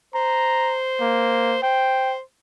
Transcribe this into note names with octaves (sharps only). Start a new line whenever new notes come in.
C5 A#5
A#3
C5 G5